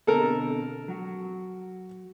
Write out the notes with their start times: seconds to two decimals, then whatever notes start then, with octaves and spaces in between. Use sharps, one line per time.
0.07 B2 D3 C4 A4 A#4
0.88 F#3 F#4